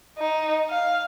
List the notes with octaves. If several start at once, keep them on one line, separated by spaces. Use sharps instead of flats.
D#4
F5